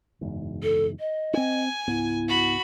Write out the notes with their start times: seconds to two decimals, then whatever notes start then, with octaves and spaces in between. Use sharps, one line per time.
0.21 F#1 E2 G#2
0.63 A4
1.00 D#5
1.33 C4 D4 G#5
1.87 C#2 G#2 B3 E4
2.28 F#4 B5